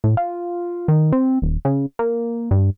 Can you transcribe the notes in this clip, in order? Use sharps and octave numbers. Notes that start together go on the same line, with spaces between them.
A2
F4
D#3
C4
D#1
C#3
A#3
G2